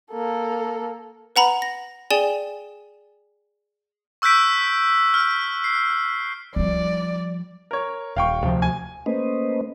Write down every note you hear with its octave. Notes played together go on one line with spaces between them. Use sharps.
A#3 A4
B4 F#5 A#5 B5
A#6
G#4 D5 G5 G#5 E7 G7
C#6 E6 F#6 G6 B6 D7
F6
C7
F3 G3 D5
A#4 C#5
D#1 F5 G5 C#6
D2 C3 F3
G#5
A3 A#3 C#4 B4 C5 D#5